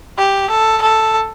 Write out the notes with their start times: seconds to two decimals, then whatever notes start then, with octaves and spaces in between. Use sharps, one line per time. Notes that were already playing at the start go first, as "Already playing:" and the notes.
0.18 G4
0.50 A4
0.82 A4